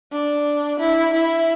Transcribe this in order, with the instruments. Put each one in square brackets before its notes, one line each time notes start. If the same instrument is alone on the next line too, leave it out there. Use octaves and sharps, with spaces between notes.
[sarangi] D4
E4
E4